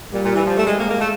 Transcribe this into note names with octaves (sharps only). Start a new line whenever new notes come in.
A#2 G3
A#2
E3
F3
A3
G#3
G#3 A#3
A#3
A3